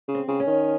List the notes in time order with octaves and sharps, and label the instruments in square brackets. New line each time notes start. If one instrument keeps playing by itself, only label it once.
[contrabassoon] C#3
[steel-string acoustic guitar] C4
[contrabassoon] C#3
[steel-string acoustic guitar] C#4
[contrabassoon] D#3